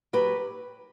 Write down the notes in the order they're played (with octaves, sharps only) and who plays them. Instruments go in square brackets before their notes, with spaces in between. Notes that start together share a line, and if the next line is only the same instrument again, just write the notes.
[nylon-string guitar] F#3 G4 B4